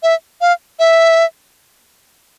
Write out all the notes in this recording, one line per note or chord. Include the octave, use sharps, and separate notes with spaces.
E5
F5
E5